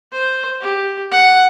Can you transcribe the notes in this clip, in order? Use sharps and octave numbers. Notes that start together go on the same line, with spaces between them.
C5
G4
F#5